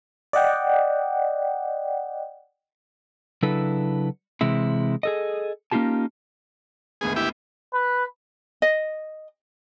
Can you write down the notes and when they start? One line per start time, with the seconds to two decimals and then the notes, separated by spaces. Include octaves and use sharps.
0.33 D5 D#5 F#5 G5
3.43 C#3 F#3 D4 E4 A4 B4
4.41 C3 E3 G#3 E4
5.03 G#4 A4 D#5
5.71 A#3 C#4 D#4 F4 G4 A5
7.01 G#1 D2 B3 G#4
7.16 E4 G4
7.74 B4
8.62 D#5